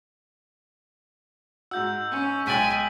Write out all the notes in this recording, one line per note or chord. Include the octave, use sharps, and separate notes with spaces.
G#2 F#4 E6 G6
C#4
B1 G#3 G5 G#5 A6 B6 D7 F#7